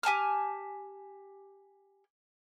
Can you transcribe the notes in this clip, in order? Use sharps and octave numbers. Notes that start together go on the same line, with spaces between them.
G4 G#5 A5 F6